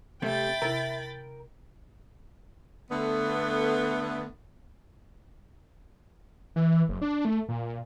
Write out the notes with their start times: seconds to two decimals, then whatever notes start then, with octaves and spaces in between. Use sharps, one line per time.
0.22 C3 G3 A3 E5 G5 B5 A6
0.62 C3 E4 A#4
2.90 D3 A3 B3
6.56 E3
6.89 F#1
7.02 D4
7.25 A3
7.49 A#2